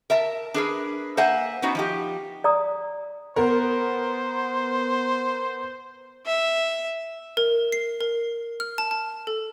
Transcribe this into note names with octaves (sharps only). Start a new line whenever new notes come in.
A#4 E5 A5
D4 G#4 A#4 B4
A#3 C5 E5 F#5 G#5
B3 C#4 D#4 F#4 C5
F3 D#4 G4
D5 A#5 D#6
B3 A#4 C5
E5
A#4
C7
A#4
F6
A5
A5
A4